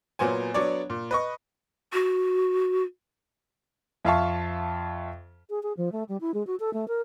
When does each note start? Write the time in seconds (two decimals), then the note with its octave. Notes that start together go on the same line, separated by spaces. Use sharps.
0.19 A#2 F#3 B3 C5 G#5
0.54 F#3 B3 D4 C#5 D5
0.90 A#2
1.11 B4 D#5 C#6
1.93 F#4
4.05 F2 F4 E5 F5 A5 C#6
5.50 G#4
5.63 G#4
5.77 F3
5.92 A3
6.09 G3
6.21 E4
6.34 G#3
6.47 F#4
6.60 A4
6.73 A3
6.88 A#4